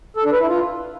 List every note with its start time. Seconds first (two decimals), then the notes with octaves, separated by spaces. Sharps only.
0.17 A4
0.24 D4
0.32 B4
0.40 E4
0.48 F4